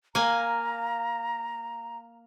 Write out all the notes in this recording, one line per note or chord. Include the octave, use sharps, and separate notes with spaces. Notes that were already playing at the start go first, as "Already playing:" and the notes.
A#3 G#5 A#5